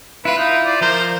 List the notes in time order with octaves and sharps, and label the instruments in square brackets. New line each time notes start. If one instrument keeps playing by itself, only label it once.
[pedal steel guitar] E4 F4 [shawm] B4
[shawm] D#4
D5
[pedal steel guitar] F3 A#4 [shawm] C5